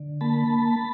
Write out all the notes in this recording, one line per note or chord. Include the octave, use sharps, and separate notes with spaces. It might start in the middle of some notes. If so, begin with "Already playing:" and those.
Already playing: D3
A#3 A5 B5